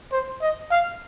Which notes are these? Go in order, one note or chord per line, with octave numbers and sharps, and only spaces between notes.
C5
D#5
F5